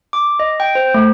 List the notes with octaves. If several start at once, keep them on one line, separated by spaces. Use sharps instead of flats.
D6
D#5
G5
C5
A3